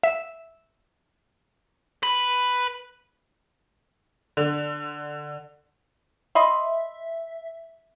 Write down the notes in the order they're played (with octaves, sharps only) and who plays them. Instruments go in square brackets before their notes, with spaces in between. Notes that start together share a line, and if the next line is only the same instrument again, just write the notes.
[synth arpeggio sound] E5
[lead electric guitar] B4 B5
[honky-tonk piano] D3
[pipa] D#5 B5 C6 [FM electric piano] E5